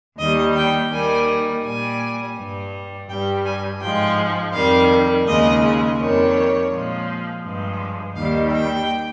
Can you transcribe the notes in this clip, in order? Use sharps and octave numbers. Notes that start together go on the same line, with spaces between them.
D#2 D#3 G3 D#5
G5
D#2 D#3 G3 G#5
A#2 G3 G#5
G2 G3
G2 G3 G5
G#5
G#2 F3 G#3 G5
F2 D#3 G3 F5
D#2 C#3 G#3 D#5
F2 D#3 G3 C#5
A#2 F3 G#3
G2 F3 G#3
D#2 D#3 G3 F5
G5